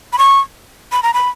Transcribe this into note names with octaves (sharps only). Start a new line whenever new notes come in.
B5
C#6
B5
A#5
B5